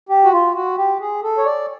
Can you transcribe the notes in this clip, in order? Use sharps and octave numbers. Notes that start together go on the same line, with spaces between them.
G4
F#4
F4
F#4
G4
G#4
A4
C#5
D5